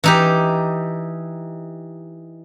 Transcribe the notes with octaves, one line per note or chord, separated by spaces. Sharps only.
E3 D#4 G4